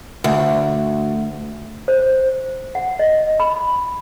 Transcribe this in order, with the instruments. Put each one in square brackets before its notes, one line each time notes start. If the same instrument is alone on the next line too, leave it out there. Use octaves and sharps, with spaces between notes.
[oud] D2
[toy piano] C5
F#5
D#5
B5